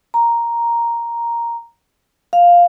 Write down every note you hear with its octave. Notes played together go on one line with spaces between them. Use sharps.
A#5
F5